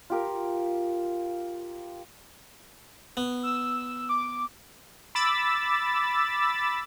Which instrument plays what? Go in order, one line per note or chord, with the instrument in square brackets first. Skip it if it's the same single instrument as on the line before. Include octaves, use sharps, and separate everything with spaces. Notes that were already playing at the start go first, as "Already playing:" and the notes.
[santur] F4 G4 A#4
[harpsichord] B3
[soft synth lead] E6
D6
[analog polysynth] B5 D6 E6 A6